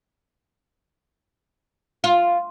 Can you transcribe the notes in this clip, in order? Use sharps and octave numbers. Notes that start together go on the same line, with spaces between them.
F4